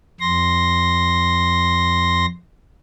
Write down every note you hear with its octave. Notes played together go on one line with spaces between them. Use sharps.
F2 C6 A#6